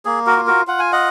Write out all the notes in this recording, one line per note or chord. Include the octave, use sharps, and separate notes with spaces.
A#3 G#4
F#4 A#4
F4
F#4 A#4
F4 F#5
G#5
D#5 F#5